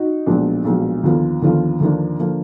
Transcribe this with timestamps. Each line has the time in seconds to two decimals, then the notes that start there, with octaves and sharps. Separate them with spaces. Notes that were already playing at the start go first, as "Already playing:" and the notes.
Already playing: D#4 F#4
0.26 B1 A#2 F3 G#3 D4
0.65 B1 A#2 F3 G#3 D4
1.03 D#2 D3 F3 B3 F4
1.42 D#2 D3 F3 B3 F4
1.80 D#2 D3 F3 A#3 D4
2.19 D3 F3 A#3 D4